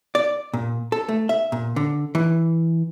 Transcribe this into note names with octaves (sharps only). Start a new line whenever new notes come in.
D5
A#2
A4
A3
E5
A#2
D3
E3